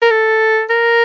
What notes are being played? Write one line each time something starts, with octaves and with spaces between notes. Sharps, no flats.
A#4
A4
A#4